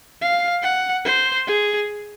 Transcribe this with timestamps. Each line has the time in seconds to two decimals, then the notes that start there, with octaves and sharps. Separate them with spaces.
0.21 F5
0.62 F#5
1.05 C5
1.47 G#4